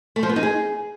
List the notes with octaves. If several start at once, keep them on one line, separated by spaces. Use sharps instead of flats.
A3
F3
B3
D#4
G#4